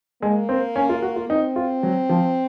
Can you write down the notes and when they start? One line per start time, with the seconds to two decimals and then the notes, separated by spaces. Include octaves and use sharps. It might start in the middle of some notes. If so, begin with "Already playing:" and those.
0.22 G#3 A#3
0.49 C4
0.76 C#4
0.89 F4
1.02 F#4
1.16 F4
1.29 C4 D#4
1.56 F4
1.83 F#3
2.09 F3